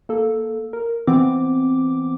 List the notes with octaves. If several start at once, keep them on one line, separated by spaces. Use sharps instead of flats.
A#3 A4
A#4
E3 B3 C4 D6